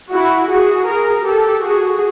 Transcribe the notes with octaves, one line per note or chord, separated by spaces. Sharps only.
E4 F#4
F#4 G#4
G#4 A#4
G4 A4
F#4 G#4